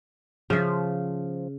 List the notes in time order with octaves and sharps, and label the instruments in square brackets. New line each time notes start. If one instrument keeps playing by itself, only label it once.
[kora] C#3 E5 [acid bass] F3